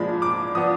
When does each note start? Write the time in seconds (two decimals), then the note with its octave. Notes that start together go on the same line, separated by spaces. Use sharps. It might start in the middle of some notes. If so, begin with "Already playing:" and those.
Already playing: A#2 F3 G#3 D4 B5
0.22 D6
0.55 F3 B3 D4 D#6